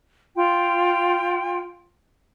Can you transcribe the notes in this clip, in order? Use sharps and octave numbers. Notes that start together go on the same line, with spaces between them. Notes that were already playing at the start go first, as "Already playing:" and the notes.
F4 G5